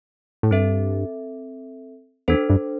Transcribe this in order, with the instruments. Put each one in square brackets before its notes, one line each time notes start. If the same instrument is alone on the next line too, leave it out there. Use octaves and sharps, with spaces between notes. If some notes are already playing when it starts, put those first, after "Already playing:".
[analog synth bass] A2
[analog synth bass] G2 [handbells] C4 A4 E5
[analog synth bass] E2 [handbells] D4 A4 C5
[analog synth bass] G2